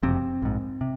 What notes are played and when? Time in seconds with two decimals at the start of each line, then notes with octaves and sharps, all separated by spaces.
0.03 F#1 F2 C3 C4
0.42 A#1 G#2
0.81 C3